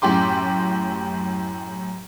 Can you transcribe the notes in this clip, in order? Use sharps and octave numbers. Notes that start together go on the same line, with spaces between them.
F#2 A2 G4 C6 D6